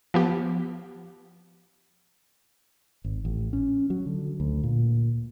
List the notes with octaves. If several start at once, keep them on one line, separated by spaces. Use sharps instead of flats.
F3 B3 G4
G#1
A1
C#4
F#3
D3
D2
A#2